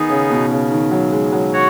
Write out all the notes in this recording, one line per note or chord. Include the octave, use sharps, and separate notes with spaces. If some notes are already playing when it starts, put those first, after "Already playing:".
Already playing: D#3 B3 D#4 G#4
C#3
B2
C#3
D#3
F#3
G#3
F#3
F#4 C#5